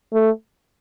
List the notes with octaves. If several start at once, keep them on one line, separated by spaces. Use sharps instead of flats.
A3